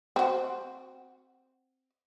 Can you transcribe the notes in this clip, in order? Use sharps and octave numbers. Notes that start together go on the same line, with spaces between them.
C4 F#4